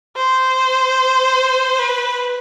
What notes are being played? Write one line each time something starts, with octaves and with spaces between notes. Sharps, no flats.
C5
B4